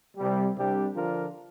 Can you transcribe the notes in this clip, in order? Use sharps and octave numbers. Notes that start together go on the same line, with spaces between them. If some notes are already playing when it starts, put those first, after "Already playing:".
C2 C3 G3
C2 C3 G3 D4 G4
D3 F3 D4 F4 A#4